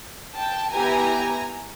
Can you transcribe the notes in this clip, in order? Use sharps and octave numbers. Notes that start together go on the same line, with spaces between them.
G5 A5
B3 E4 G4 G#5 A#5